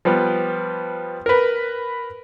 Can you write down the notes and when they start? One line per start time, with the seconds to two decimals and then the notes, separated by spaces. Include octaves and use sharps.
0.05 F3 G3 B3
1.26 A#4 B4